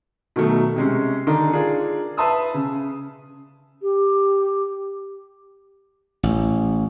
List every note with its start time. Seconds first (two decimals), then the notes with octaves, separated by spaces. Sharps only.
0.36 B2 D#3 F#3 A3
0.76 C3 G#3 C#4
1.27 D3 D#3 D4 D#4
1.53 D4 F4 G#4 A#4
2.17 B4 E5 A5 C6 D#6 E6
2.54 C#3
3.82 G4
6.23 A1